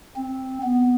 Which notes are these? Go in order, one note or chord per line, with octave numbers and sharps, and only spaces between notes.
C4
B3